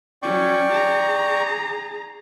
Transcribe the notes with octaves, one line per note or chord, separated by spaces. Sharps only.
F#3 C#4 D5 G5 C#6
G#4 A#5